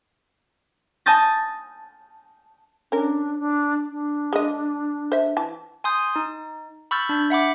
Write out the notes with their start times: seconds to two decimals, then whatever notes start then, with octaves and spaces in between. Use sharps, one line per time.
1.06 G#5 A5 D#6 G6 A6 A#6
2.92 C#4 D4 A#4
3.39 D4
3.91 D4
4.33 G#3 D#5
5.12 C5 E5
5.37 E3 A5
5.84 G#5 C6 D#6 G6
6.16 D#4
6.91 B5 C#6 E6 F6 G6 A6
7.09 D4 G6
7.30 E5 F#5 B5 D6